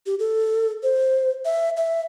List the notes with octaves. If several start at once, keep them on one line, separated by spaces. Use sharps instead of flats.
G4
A4
C5
E5
E5